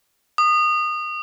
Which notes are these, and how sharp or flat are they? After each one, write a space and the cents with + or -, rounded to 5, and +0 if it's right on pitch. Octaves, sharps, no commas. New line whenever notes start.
D#6 -25